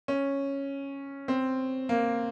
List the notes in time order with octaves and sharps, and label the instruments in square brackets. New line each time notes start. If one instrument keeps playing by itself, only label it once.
[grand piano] C#4
C4
A#3